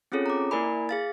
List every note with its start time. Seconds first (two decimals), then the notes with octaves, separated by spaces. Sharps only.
0.12 C4 C#4 F4 G#4 A4 C#5
0.26 A#5 D6
0.51 A#3 E4 A#4 D5 G#5 B5
0.89 G#4 F5 A6